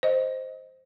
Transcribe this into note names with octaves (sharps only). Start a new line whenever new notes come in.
C5 D#5